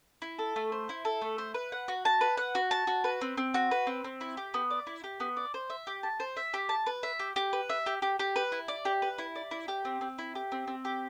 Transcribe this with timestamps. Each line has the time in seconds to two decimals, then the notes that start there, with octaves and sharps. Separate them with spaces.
0.22 E4
0.39 A4
0.56 A3
0.72 C5
0.89 E4
1.05 A4
1.22 A3
1.38 C5
1.54 B4
1.72 F#5
1.88 F#4
2.05 A5
2.21 B4
2.37 F#5
2.55 F#4
2.71 A5
2.87 F#4
3.04 B4
3.21 C4
3.38 C4
3.54 F#4
3.71 B4
3.87 C4
4.04 C4
4.21 E4
4.37 G4
4.54 B3
4.70 D5
4.87 E4
5.04 G4
5.20 B3
5.37 D5
5.54 C5
5.70 E5
5.87 G4
6.03 A5
6.20 C5
6.37 E5
6.54 G4
6.69 A5
6.86 B4
7.03 E5
7.19 G4
7.36 G4
7.53 B4
7.69 E5
7.86 G4
8.02 G4
8.19 G4
8.36 B4
8.52 E4
8.68 D5
8.85 G4
9.02 B4
9.18 E4
9.36 D5
9.51 E4
9.68 G4
9.85 C4
10.01 C4
10.18 E4
10.35 G4
10.52 C4
10.67 C4
10.85 G4